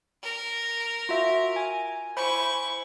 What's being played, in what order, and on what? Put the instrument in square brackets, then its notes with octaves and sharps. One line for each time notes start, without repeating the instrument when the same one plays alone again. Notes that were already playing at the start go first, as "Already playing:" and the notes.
[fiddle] A#4
[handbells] F4 F#4 E5
G#5
[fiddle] E4 C#6 [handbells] C5 G#5 B5